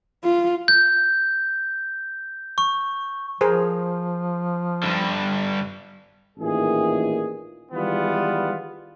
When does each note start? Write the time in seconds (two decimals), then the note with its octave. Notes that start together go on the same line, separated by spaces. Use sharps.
0.24 F4
0.68 G6
2.58 C#6
3.41 F3 G#4 A#4 C5
4.83 G2 D3
6.38 A1 A#2 D#3 E3 G#4
7.72 D#3 E3 G3 G#3 B3 F4